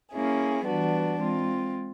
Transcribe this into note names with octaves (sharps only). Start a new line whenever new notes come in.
A#3 C#4 E4 G#4
E3 G3 B3 D4 F#4
G#3 C4 F4